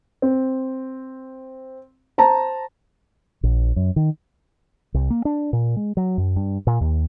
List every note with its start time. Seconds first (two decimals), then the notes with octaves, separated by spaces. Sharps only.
0.22 C4
2.18 C5 A5 A#5
3.43 A#1
3.76 F#2
3.96 D#3
4.94 C2
5.10 A#3
5.25 D4
5.53 A#2
5.76 G#3
5.97 F#3
6.18 F#2
6.36 G2
6.67 A#2
6.81 D#2